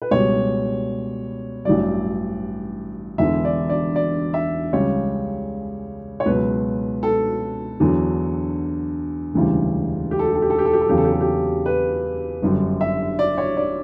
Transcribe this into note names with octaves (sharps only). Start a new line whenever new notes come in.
B4
C#2 B2 G3 C#5
A1 G2 F#3 D5
E1 E2 D3 E5
D5
D5
D5
E5
C#2 C#3 G3 C#5
C#5
C#2 B2 F#3 B4
A4
E2 D3 F#3
E1 D2 C#3 E3 G3
G4
A4
G4
A4
G4
A4
G4
A4
G4
A4
E2 C#3 F#3 G4
A4
G4
A4
G4
B4
G1 F#2 D3 G3
E5
D5
C#5
D5